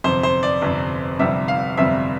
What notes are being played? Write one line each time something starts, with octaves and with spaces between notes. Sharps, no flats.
G1 F2 C3 C5
C5
D5
G1 F2 C3
G1 F2 C3 G3 E5
F5
G1 F2 C3 G3 E5